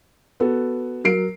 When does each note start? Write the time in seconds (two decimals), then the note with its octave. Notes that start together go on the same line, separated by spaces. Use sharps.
0.40 B3 F#4 A4
1.04 F#3 A#4 C7 D7